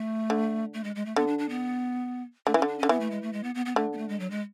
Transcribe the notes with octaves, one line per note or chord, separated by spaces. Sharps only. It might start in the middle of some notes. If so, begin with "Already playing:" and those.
Already playing: A3
D3
A3
G#3
G#3
A3
D3 B3
D4
D4
B3
D3 A3
E3 C#4
D3
D4
D3 C#4
E3 B3
A3
G#3
A3
G#3
B3
B3
B3
D3 A3
B3
A3
G#3
F#3
G#3